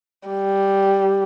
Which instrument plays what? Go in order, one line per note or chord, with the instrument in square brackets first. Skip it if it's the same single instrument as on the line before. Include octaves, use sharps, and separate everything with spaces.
[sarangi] G3